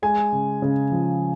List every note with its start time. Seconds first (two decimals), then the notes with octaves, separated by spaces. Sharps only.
0.02 G#3 G#5
0.32 C#3
0.62 C#3
0.92 F3